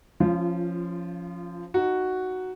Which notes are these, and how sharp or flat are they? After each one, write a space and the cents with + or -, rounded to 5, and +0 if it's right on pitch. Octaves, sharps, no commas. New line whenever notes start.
F3 +0 C#4 +0 F4 -30
D#4 +0 F#4 +0